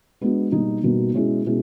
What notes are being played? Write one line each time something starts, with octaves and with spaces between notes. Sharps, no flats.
G#3 B3 D4 F#4
B2 G3 A#3 D#4
B2 G3 A#3 D#4
B2 G#3 C#4 E4 G#4
B2 G#3 C#4 E4 G#4